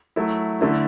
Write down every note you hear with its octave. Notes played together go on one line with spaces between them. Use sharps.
F#3 A3 E4
D3 A3 E4